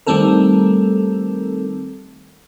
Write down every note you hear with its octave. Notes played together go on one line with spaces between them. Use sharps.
D#3 G3 A3 C4 A4 A#4